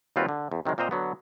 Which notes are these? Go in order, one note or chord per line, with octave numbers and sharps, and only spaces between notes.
D#2 G3 C4 F4 F#4 B4
D3
E2
C3 D#3 F#3 G#3
A#2 C4 A#4 C5 D#5 A#5
D3 F#3 B3